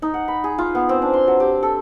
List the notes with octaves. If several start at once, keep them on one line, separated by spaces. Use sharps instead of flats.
D#4
F#5
B5
G#4
F4
B3
C4
D4
C6
F#3
G4
A4